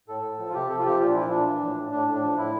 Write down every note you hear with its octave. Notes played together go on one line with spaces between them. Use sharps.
A2 A4
A2
F3
F4
C3 G4
C3 A4
F4
F3 G4
A#2 F4
D4
F3 E4
A#2 D4
E3
A2
A2
A2 D4
A2
D4
F3
A2 E4